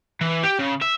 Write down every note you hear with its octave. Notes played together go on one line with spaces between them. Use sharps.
E3
G4
C#3
E5